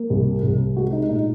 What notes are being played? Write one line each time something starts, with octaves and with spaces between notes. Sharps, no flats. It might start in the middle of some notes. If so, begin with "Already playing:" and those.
Already playing: A#3
C2
C2
G#3 F#4
D#4
A#2 D#4